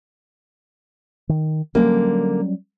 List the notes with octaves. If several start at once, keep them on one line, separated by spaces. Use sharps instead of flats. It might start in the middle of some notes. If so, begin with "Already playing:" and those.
D#3
D3 F#3 G3 A#3 C#4